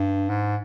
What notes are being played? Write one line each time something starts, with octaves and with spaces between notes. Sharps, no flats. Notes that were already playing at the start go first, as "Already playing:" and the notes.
Already playing: G2
G#2